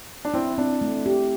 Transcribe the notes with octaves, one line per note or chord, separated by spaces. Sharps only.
D4
C4 E4
C4 D4
A3
G4